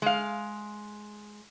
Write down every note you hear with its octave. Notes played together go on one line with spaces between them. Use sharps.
G#3 F5